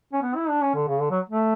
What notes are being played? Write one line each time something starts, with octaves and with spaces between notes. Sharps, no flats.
C#4
B3
E4
D4
C#4
D3
C#3
D3
F#3
A3